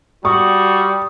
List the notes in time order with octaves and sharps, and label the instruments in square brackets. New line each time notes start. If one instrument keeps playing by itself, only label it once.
[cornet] G3 [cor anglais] F#4 [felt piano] C#6 [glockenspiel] D#6